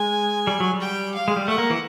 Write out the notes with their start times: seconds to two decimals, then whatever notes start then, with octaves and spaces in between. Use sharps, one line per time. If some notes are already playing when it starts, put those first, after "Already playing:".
Already playing: G#3 G#5
0.47 G3
0.60 F#3
0.74 G3
0.81 G5
1.14 F5
1.28 G#3
1.36 G3
1.48 A3 F#5
1.58 A#3
1.70 E3